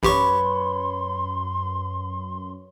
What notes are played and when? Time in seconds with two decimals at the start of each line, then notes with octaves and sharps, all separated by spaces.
0.03 A1 F#2 G4 B4 C#5 C6 C#6